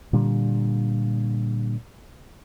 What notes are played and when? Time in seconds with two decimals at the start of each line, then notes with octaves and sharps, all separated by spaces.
0.13 A#2 D3 G3